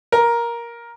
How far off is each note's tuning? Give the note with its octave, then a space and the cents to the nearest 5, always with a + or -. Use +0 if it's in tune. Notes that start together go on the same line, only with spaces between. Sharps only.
A#4 +10